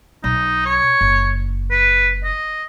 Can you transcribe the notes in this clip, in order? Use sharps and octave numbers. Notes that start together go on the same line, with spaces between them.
B1 D#4
C#5
F#1
B4
D#5